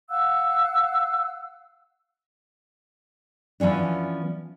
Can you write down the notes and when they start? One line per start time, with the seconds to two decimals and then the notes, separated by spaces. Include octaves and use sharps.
0.10 F5 F#5 E6 F#6
3.60 E3 F3 B3 C#4 D4